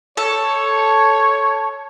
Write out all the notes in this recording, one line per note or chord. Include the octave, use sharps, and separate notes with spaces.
A4 C#5